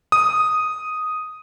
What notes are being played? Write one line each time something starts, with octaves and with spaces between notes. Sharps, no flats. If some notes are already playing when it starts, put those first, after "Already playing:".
D#6